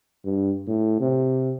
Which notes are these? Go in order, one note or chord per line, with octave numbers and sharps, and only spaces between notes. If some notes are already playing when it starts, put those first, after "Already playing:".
G2
A2
C3